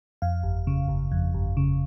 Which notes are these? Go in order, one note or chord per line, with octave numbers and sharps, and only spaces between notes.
F2 F5
G1
C#3
G1
F2
G1
C#3